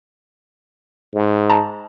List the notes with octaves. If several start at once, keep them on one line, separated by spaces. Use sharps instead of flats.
G#2
A5 A#5